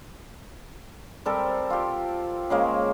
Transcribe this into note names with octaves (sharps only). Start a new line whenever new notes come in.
G3 C4 A4 A#4
F4 G4
C#3 G#3 A#3